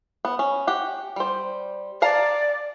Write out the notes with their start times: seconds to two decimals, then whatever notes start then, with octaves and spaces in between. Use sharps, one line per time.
0.25 B3
0.39 C#4
0.67 G4 F#5
1.16 G3 C5
2.02 D5 F5 A5 A#5